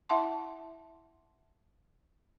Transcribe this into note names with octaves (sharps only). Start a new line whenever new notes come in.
E4 E5 F#5 A5 C6